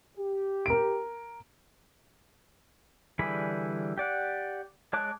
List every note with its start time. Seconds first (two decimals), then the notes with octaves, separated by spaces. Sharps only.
0.18 G4
0.66 A#4 D7
3.19 D3 E3 G3 G#4 B5
3.98 G4 D5 F#5
4.93 G#3 C#5 A5 D6 F#6